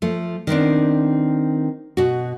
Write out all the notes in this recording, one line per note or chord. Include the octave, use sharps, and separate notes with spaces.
F3 A3
D#3 B3 C4 D4
B2 F#4